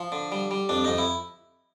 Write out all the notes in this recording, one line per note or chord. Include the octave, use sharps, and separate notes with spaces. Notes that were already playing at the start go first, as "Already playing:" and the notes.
Already playing: F3
D3
G3
G3
F2 D4
F2 D#4
E4